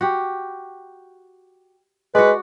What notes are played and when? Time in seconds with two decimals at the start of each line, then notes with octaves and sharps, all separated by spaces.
0.01 F#4 G4
2.15 G#3 F#4 B4 D5